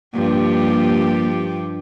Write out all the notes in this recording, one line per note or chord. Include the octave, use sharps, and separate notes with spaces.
G2 F3 A#3 G4